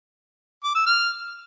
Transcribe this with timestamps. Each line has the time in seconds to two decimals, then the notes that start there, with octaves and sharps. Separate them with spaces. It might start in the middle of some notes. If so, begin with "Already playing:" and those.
0.64 D6
0.75 E6
0.86 F6